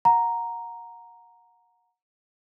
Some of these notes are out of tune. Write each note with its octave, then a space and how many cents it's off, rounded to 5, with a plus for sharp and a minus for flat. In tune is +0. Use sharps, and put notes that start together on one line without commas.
F#5 -25 A#5 +0